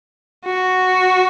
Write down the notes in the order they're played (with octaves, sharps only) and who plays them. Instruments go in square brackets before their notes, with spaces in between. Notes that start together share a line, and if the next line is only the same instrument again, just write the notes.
[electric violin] F#4